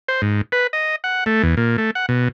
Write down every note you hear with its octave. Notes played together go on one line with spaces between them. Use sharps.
C5
G#2
B4
D#5
F#5
A3
E2
A#2
A3
F#5
B2